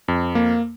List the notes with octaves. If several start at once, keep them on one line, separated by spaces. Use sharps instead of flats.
F2
A#3